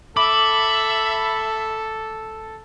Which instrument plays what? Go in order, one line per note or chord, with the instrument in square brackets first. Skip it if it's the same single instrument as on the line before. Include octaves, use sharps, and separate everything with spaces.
[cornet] A4 [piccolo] E5 [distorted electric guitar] B5 [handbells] D6